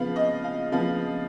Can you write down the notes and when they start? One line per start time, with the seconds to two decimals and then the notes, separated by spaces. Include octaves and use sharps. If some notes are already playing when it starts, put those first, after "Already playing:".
Already playing: C#3 F3 B3 F5
0.16 D#5
0.44 F5
0.72 C#3 F3 B3 F5